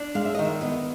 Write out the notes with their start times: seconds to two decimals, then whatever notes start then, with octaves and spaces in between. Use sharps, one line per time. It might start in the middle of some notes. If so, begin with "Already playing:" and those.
Already playing: D4
0.15 G#3 F5
0.25 E5
0.35 D#3 D#5
0.45 E5
0.61 B3 D#5